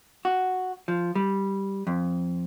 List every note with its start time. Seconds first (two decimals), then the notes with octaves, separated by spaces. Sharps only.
0.25 F#4
0.88 F3
1.15 G3
1.87 F2